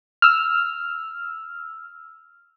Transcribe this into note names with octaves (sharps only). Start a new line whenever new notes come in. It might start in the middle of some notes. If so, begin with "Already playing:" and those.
E6 F6